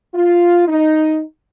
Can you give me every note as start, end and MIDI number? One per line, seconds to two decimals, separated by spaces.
0.14 0.64 65
0.68 1.21 63